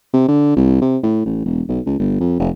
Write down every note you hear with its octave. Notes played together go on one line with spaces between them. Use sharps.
C3
D3
C2
C3
A2
A1
E1
B1
C#2
G1
F2
F1